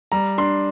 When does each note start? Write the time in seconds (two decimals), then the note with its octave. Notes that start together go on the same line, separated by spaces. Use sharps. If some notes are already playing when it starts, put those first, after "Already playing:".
0.12 G3 A#5
0.38 D4 C6